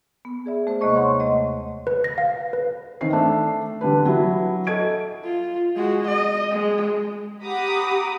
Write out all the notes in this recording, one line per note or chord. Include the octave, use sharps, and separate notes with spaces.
B3
G#4 D5 E5
A3 C5
D#2 C3 G#3 A#3 D#5 C#6
C#5 F#5 C6 C#6
D#2 A3 D#5 C6
B4
A#6
F5
B4
D#3 C4 C7
A3 D4 E5
D3 G3 D4 B4
F#3 E4
A4 D#5 G#6 D7
F4
G#3 F#4
D#5
G#3
G4 F#5 A#5 B5 D6 D#6